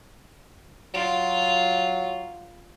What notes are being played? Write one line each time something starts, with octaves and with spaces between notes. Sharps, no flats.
F#3 F4